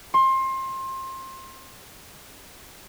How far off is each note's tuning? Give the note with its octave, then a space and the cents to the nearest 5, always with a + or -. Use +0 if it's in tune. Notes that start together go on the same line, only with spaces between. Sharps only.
C6 +25